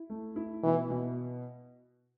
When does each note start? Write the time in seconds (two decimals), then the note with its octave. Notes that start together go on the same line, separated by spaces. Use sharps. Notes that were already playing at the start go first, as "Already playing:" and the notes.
Already playing: E4
0.10 A3
0.36 E4
0.63 B2 E3
0.90 B2